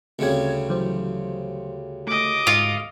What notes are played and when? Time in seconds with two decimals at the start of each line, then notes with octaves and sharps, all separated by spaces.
0.19 D2 C#3 G3 C4 G#6
0.69 E3 F#3 C5
2.07 A3 D#5 D6
2.47 G#2 F4 C#7